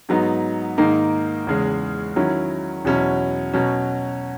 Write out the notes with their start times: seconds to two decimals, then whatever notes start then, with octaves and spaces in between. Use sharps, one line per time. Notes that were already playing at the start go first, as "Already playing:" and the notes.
0.09 G#2 F#3 B3 D#4
0.78 G#2 D#3 A#3 D#4
1.47 E2 C#3 G#3
2.16 D#3 F#3 C#4 E4
2.85 E2 B2 F#3 C#4 E4
3.53 B2 F#3 C#4